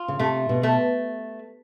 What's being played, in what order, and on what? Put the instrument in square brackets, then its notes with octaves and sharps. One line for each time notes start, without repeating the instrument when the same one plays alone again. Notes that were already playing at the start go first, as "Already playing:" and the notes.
Already playing: [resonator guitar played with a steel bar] F4
[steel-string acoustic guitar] C#3
[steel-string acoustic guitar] C3 [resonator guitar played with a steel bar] A3
[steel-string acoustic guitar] B2
[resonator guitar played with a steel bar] A3